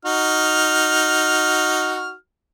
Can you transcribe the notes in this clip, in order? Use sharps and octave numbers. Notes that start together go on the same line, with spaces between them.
D#4 F#4 F6